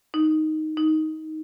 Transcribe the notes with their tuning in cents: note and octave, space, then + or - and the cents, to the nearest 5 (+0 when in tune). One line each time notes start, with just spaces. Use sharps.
D#4 +0
D#4 +10